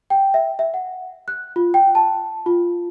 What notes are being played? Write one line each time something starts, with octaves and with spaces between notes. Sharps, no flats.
G5
E5
E5
F#5
F#6
F4
G5
A5
F4